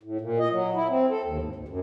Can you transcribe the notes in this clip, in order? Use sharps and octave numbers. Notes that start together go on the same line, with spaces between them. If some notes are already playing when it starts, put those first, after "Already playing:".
A2
A#2
D#5
F#3
E4
C4
A4
D#2
G#2
D2
F#2